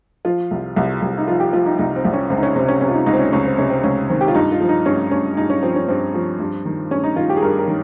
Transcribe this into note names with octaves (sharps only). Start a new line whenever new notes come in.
F3 F4
C2
C2
C2
D#4
F3 F4
G4
F3 F4
D#4
C2 D#4
C4
C2
C#4
C#2 C4
D#4
C#4
C3 C4
C#4
C3 C#4
F4
D#4
C#2 D#4
C4
C#4
C#2 C#4
C4
C3 C#4
C4
C#2 C#4
D#3 C4
G4
F4
G2 D#4
F4
F3
D#4
G2 C#4
G2 C#4
G2 D#4
C#4
F3 C4
C#4
G2 C4
F3
G2
D#3
G2 C#4
D#4
D#3 F4
G4
G#4
G2 A#4
A#4
D#3